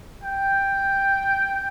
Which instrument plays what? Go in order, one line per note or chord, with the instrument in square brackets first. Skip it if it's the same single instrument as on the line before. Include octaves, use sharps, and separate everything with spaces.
[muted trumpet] G5